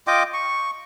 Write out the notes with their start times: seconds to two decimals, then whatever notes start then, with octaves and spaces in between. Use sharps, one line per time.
0.07 F4 D#5 G5 D6
0.34 C#6